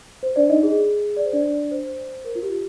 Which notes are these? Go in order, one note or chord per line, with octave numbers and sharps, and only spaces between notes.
C5
D4 D5
D#4 D#5
G#4
D5
C5
D4 D5
C5
A#4
F4
G4